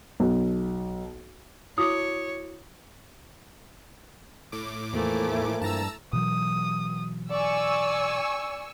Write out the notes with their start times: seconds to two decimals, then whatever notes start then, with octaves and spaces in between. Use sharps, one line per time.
0.20 B1
1.78 E4 F#4 C#5 D6 D#6
4.52 A2 D6
4.93 E2 E3 F3 A3 A#3 E4
5.61 G2 A5 A#5 E6
6.13 B2 E3 F#3 D#6
7.31 D5 G#5 C#6 E6